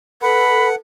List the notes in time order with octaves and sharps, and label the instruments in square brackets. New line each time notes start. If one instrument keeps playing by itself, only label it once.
[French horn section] A4 [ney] B4 [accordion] F#5 [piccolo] B5